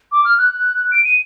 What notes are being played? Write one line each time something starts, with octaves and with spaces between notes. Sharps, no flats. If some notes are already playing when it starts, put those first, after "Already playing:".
D6
F6
F#6
D7
D#7